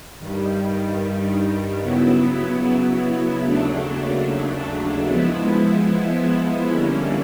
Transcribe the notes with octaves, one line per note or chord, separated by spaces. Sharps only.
G2 D#3 G3
C#3 F#3 B3 E4
D#2 C#3 F#3 A3 D4
F3 G#3 B3 E4
D3 G3 A#3 C#4 E4